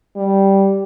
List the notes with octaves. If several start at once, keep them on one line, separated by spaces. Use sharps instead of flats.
G3